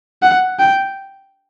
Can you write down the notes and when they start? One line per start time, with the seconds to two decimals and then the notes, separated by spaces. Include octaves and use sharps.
0.22 F#5
0.59 G5